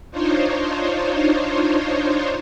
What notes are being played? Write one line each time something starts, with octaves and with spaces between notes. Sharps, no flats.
D4 D#4 F4 C5 C#5